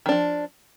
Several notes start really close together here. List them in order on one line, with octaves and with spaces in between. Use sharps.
D#3 D4 F3